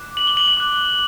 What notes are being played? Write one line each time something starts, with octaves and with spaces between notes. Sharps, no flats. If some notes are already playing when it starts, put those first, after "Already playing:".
Already playing: D6 F#6
F#7
G7
F#7
F#7
D6 F#6